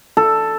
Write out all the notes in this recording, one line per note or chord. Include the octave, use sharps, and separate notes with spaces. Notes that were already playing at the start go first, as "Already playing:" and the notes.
A4